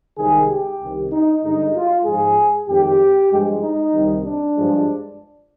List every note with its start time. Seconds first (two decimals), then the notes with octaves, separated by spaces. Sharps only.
0.17 C2 C3 D#3 G#3 G#4
0.49 G4
0.80 C2 C3 D#3
1.11 D#4
1.42 G2 D3 G#3 D#4
1.74 F4
2.05 G#2 F3 G#3 G#4
2.67 F2 D#3 G#3 G4
3.31 G2 F3 G#3
3.62 D#4
3.93 C2 C3 D#3 G3
4.25 D4
4.55 G2 F3 G#3